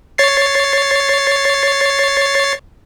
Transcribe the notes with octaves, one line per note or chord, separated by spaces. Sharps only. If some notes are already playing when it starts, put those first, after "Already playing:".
C#5 A6 C7